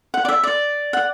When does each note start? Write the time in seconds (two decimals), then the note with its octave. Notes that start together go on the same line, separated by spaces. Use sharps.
0.14 F#5
0.25 D5
0.29 E5
0.43 D5
0.93 F#5